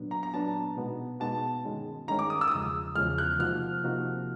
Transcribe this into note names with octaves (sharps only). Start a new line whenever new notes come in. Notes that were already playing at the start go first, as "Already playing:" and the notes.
Already playing: A#2 F#3 B3 D4
A#5
A#5
A#2 F#3 B3 D4 A5
B2 G#3 B3 D#4 F#4
B2 G#3 B3 D#4 F#4 A5
G2 D#3 G#3 C#4
G2 D#3 G#3 C#4 A#5
D6
D#6
E6
D#6
E2 C#3 F3 G#3 E6
E2 C#3 F3 G#3 F6
F#6
C3 F3 A#3 D#4 F#4 F6
C3 F3 A#3 D#4 F#4